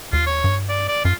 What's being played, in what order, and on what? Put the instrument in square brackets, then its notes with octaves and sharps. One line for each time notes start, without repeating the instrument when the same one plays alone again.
[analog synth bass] D#2 [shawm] F4
[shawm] C#5
[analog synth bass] G2
[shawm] D5
D5
[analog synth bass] F#2 [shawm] F4